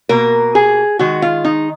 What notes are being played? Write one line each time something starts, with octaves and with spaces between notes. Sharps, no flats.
B2 A#3 A#4
G#4
D#3 G#3 F#4
F4
D#4